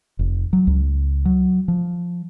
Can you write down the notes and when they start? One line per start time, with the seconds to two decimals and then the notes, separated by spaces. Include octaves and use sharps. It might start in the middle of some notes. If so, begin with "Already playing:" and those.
0.19 F1
0.53 F#3
0.67 C#2
1.25 F#3
1.68 F3